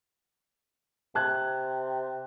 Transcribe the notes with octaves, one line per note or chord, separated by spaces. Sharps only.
C3 A5 F#6 G#6